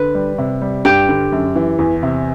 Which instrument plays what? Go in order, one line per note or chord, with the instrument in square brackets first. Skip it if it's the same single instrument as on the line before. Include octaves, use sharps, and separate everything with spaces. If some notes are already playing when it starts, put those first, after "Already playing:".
Already playing: [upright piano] D3 [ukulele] B4
[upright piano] G3
C3
G3
[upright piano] G2 [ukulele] G4
[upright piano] D3
F#2
E3
E2
C3